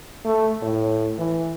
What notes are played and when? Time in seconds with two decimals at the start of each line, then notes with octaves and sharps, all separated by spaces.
0.25 A3
0.62 A2
1.18 E3